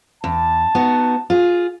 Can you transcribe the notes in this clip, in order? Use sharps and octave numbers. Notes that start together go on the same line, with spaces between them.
E2 A5
B3 D#4 F#4
F4 G#4